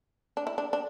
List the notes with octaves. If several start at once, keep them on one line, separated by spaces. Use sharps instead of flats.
D4
E4
D4
D4